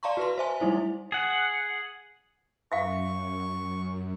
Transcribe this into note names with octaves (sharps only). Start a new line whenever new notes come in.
D5 F5 A5 A#5 C6 C#6
F#4 B4 C6
C5 E5 G#5
G3 A3 D#4 E4 C5
G#4 F#5
F#2 E5 F5 C#6